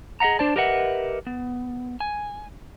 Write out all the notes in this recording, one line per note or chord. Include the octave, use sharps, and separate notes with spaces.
G#4 D#5 E5 F#5 A#5
D4 C5 D5 A5
G4 A#4 B4 D#5 E5 F#5
B3
G#5